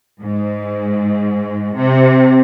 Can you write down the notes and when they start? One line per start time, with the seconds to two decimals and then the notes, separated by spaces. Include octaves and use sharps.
0.21 G#2
1.76 C3